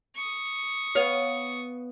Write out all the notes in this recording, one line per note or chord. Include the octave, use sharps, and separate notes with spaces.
C#6 D#6
B3 C#5 F5